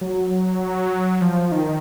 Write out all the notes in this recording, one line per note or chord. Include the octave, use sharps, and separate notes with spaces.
F#3
F3
D#3